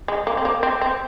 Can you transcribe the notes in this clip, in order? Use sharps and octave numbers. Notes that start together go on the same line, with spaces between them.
G#3
A#3
C4
A#3
C4
C4